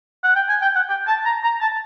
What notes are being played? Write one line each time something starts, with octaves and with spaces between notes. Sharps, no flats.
F#5
G5
G#5
G5
F#5
G5
A5
A#5
A#5
A5